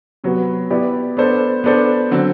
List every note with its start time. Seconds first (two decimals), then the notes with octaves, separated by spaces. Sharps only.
0.24 C3 F#3 B3 F#4
0.70 B3 E4 G4 D5
1.17 B3 D4 A4 C5
1.64 B3 D4 A4 C5
2.11 D3 F#3 C4